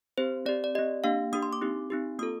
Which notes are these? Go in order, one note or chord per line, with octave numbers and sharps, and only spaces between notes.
C4 G4 C5
C4 G4 D5
D5
C4 G4 D#5
A#3 D4 G4 F5
A#3 D4 G4 D#6
C6
D6
C4 D#4 G4
C4 D#4 G4
A#3 F4 A4 D#6